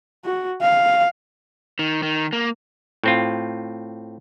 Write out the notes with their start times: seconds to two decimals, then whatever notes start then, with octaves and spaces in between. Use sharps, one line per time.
0.25 F#4
0.61 F5
1.79 D#3
2.03 D#3
2.33 A#3
3.04 A2 C4 F4